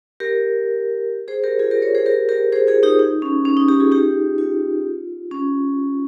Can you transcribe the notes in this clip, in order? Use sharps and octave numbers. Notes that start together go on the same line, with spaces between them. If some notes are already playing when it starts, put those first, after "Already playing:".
G4 A#4
G#4 C5
G4 A#4
F4 G#4
G4 A#4
A#4 C#5
G#4 C5
G4 A#4
G4 A#4
G#4 C5
F4 G#4
D#4 G4
D#4
C#4
C#4
D#4
D#4 G4
F4 G#4
D#4 G4
F4
C#4